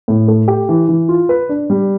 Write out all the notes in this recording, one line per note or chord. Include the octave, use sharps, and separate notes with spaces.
A2
A3
G4
E3
E3
F4
B4
D4
G3